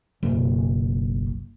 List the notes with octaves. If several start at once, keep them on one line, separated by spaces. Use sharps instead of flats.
F#1 B1